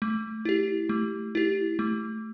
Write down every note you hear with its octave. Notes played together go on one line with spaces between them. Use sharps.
A3
E4 G4
A3
E4 G4
A3